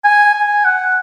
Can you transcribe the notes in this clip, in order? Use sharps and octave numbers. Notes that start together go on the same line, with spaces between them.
G#5
G#5
F#5